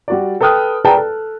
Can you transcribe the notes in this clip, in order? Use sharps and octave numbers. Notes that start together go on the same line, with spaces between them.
G3 F#4 D5
A4 B4 G5 D#6 F6 F#6
G#4 B4 D5 G5 A5 A#5
A4